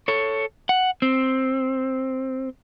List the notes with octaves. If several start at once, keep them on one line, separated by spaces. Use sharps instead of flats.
A4 C#5
F#5
C4